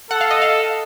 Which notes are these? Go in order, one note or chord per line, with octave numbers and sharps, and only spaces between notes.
A4 F#5
F5
D#5
F5